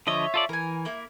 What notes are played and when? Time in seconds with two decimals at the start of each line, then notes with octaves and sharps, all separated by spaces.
0.07 D3 F3 C#5 D#5 E5
0.34 F4 A4 D5
0.49 E3 A#4 G#5
0.85 A#3 E4